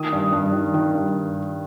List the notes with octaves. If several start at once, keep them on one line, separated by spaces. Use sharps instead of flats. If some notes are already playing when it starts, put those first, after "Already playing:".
Already playing: D#3 D#6
G2
G2
D#3
D#3
G2